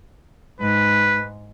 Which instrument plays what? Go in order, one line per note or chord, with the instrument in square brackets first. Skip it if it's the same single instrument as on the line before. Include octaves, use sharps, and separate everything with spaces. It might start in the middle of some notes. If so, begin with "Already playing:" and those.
[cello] G#2 [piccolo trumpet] B4